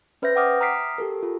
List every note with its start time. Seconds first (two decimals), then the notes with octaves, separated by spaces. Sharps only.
0.22 C#4 B4 C5 E5 G6 A#6
0.36 E5 F#5 G5 D6 D#6 F6
0.61 A#5 D#6 F6 B6 C7 D7
0.98 G4 A4 A#4
1.23 F4